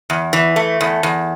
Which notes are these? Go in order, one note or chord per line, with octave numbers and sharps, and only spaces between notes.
E2
E3
A3
E2
E2